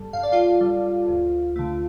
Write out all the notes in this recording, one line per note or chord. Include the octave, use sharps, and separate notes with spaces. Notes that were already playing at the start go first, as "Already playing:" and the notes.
Already playing: G2 G3 A4 A5
G2 F5
D5
F4 F5
G3
D2
D3 A3